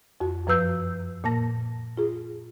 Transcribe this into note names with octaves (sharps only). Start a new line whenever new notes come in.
F2 F#4
F#2 F3 B4 E6 G6
A#2 A#3 A5 A#6
F4 G#4